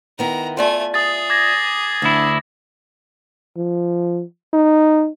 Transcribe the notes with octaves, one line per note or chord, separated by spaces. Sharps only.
D#3 B3 E4 A#5
A3 F4 D5 E5 G#5
G#4 D#6 A6
D6 G#6 A#6
D2 D3 E4
F3
D#4